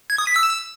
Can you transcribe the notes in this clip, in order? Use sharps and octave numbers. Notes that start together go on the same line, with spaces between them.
G#6
D#6
B6
E6